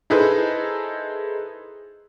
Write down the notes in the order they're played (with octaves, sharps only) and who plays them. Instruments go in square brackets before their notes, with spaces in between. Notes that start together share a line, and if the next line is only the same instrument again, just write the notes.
[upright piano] D#4 E4 G#4 A4 B4 C5